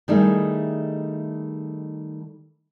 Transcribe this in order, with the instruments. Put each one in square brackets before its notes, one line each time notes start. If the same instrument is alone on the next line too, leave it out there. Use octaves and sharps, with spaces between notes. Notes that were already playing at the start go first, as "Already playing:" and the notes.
[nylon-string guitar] D#3 G3 A3 D#4 E4 G#4